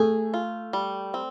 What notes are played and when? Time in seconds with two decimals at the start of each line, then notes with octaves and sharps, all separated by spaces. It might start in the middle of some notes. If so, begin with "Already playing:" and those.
Already playing: A3 G#4
0.34 F4
0.73 G3
1.14 C4